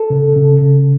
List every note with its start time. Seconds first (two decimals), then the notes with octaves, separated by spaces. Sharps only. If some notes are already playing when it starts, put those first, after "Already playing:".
Already playing: A4
0.10 C#3
0.36 C#3
0.61 C#3